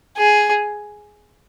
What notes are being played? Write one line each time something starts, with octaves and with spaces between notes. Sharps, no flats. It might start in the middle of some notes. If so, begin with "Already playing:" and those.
G#4